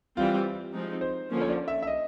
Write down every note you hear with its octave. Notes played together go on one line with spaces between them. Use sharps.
E3 G3 C4 F4
F3 G#3 C4 D#4
C5
D3 F3 A#3 C#4
C#5
D5
E5
E5
D#5